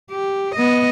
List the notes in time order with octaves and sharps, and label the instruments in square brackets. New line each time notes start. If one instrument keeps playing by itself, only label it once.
[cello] G4
B3 D#5